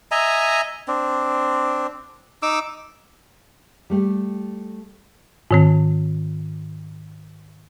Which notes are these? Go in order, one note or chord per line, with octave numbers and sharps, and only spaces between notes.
D#5 E5 G#5 A#5
C4 D4
D#4 D6 E6
G3 A3 G4
G#2 D#3 C4